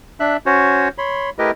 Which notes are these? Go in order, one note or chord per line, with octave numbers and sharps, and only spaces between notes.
D4 E5 F#6
C#4 F#4 C5 C#5
C#5 B5 C6
A3 E4 G4 A#4 B4 D#5